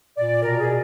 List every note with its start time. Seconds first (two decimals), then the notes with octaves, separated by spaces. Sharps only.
0.17 A#2 D5
0.43 B2 A#4
0.60 G#4